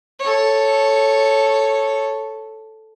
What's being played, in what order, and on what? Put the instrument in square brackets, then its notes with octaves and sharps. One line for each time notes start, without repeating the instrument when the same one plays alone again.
[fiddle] A4 C#5